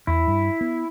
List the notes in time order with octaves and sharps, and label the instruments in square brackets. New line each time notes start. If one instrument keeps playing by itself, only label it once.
[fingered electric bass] E2 [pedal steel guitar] E4
[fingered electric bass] G2
B3